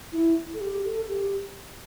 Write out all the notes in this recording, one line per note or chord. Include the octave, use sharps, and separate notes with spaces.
E4
A4
G4
A4
G4